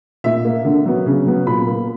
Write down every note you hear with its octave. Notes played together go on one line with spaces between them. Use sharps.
A#2 E5
A#3
D3
F#3 B3
C#3
F#3 B3
A#2 B5
A#3